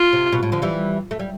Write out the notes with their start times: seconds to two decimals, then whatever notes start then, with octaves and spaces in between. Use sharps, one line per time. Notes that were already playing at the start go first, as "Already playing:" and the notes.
Already playing: F4
0.13 C3
0.32 B2
0.43 A2
0.52 D3 F3
0.62 E3 G3
1.11 A3
1.20 G3